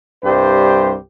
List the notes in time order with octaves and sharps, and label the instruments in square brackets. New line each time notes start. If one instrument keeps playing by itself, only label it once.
[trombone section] C2 G2 G4 C5